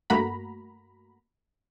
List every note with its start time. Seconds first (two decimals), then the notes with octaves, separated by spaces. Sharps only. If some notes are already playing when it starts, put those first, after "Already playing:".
0.10 G2 A3 A#3 F#4 A#5 B5